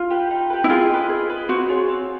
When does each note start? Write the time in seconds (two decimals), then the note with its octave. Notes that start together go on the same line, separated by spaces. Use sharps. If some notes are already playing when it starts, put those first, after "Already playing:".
Already playing: F4
0.10 G4 B4
0.30 D#4
0.50 G4 B4
0.64 E4
0.70 F4 G#4
0.89 B4 D#5
1.09 G#4
1.29 B4 D#5
1.48 C4 F#4
1.69 F4 G#4 C#5
1.88 C4